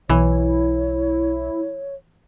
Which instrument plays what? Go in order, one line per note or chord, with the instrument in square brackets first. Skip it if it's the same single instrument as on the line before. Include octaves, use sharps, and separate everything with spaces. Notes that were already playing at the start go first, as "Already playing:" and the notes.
[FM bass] B1 [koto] E3 [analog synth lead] E4 [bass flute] C#5